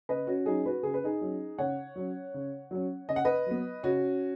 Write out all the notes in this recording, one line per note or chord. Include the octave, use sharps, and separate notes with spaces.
C#3 B4 D#5
C#4 F#4
F#3 C#4 D#4 G#4
F#4 B4
C#3 G#4
B4
D#4 G#4
F#3 C#4
C#3 C#5 F#5
F#3 C#4
C#3
F#3 C#4
C#3 D#5
F#5
B4 D#5
F#3 B3
C#3 C#4 F#4